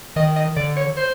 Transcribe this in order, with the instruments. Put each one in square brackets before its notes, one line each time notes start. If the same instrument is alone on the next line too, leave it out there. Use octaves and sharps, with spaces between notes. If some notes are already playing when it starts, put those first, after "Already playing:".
[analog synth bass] D#3 [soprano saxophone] D#5
[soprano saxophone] D#5
[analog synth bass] D3 [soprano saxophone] D5
[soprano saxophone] C#5
C5